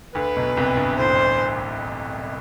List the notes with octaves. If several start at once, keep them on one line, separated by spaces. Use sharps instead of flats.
D2 D3 B4
B1 B2
C2 C3
G2
A2 C5
G2
A1 A2